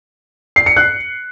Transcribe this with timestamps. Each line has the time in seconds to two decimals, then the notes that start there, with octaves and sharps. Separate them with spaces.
0.56 C7
0.66 C#7
0.76 F#6